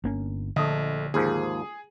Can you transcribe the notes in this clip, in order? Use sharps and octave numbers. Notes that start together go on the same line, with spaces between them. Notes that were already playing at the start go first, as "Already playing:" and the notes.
G1 A#3 C#4
A#1 D3 A3 D#5
D#2 G#2 F3 G#4